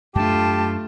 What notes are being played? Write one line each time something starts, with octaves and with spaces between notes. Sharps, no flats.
F#2 A3 D4 F4 G4 A5